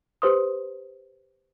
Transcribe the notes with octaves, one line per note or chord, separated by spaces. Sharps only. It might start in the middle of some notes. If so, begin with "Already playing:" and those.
G4 B4 C5 C6 D#6